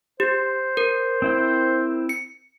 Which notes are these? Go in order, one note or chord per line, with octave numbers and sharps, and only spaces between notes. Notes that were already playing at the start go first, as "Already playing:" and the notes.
G4 C5
A#4
C4 E4 G5
C#7